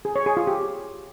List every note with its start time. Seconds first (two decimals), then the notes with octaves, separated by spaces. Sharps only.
0.05 G#4
0.16 C#5
0.26 G#4
0.37 F4
0.47 G4